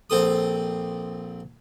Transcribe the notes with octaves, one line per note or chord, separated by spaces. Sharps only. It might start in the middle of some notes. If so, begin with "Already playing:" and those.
A#1 C4 A4 D#6